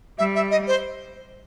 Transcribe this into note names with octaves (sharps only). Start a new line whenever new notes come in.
G3 E5
E5
D#5
C5